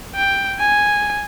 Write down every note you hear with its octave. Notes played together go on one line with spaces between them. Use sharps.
G5
G#5